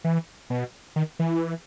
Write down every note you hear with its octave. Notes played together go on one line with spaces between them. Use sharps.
E3
B2
D#3
E3